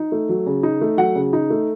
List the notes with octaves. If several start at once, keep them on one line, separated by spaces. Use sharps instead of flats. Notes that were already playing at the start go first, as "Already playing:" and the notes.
Already playing: D#4
A3
F#3
C#3
D#4
A3
F#3 F#5
C#3
D#4
A3